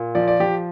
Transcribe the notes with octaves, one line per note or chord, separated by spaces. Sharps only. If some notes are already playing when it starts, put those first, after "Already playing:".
Already playing: A#2
F3 D5
D5
F3 G4